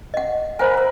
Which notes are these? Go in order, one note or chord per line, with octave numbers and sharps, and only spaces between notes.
D#5 F#5
A#4 C5 F#5 G#5 B5
B4 E5